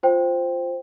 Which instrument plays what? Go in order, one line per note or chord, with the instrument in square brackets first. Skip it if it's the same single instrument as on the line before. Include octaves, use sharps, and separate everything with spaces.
[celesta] F4 C5 G5